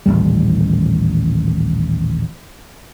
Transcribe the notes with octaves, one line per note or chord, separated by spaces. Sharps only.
D#1 A1 E2 G3